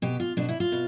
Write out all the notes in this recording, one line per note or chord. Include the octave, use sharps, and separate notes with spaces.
B2 G4
F4
B2 D4
E4
F4
B2